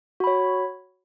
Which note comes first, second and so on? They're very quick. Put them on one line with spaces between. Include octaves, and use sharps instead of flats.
F#4 B5 C#5